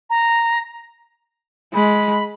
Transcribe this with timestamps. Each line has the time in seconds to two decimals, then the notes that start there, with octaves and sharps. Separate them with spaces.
0.10 A#5
1.74 G#3 B5